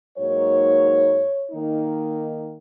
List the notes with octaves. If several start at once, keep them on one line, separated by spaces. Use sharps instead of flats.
G#2 F#3 A#3 D#4 C#5
D#3 A#3 D#4